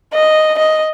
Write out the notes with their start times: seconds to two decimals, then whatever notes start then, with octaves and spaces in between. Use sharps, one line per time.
0.14 D#5
0.58 D#5